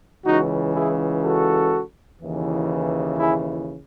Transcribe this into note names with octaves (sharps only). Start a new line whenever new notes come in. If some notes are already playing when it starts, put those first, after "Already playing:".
C#2 C#3 E3 D#4 F#4
E4 G#4
F#4 A4
D#2 C#3 E3
E4 G#4